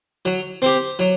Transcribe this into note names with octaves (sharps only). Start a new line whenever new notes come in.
F#3
C4 G4
F#3